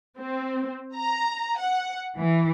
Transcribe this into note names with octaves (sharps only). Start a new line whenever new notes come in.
C4
A#5
F#5
E3